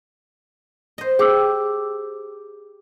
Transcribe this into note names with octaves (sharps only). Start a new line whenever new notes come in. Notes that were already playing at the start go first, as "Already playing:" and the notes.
C5 D#5
G4 G#4 D6 E6